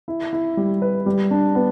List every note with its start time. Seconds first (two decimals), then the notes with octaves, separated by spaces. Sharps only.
0.08 E4
0.33 E4
0.57 G3
0.82 B4
1.06 G3
1.31 D4
1.55 B3